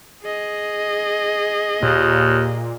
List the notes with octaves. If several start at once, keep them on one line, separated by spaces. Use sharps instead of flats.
G#4 D#5
D#2 A#2